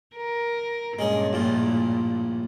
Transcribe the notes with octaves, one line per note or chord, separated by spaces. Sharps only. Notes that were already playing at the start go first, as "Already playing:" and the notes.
A#4
G2 A#2 G#3 C#4 G#4
A#1 A2 F4